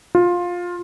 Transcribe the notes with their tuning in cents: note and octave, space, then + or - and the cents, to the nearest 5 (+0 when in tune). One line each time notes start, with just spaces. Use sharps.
F4 +15